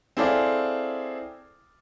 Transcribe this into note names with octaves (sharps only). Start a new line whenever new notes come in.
C4 E4 G#4 A4 D5 F5